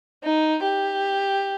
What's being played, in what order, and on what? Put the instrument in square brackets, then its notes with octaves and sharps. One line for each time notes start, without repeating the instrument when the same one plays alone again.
[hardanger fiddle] D#4
G4